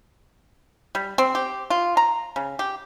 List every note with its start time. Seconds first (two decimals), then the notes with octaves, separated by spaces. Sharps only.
0.95 G3
1.18 C4
1.35 G4
1.70 F4
1.97 A#5
2.36 C#3
2.59 G4